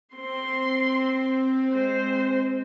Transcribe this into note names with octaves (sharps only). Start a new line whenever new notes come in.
C4 C6
G#3 C5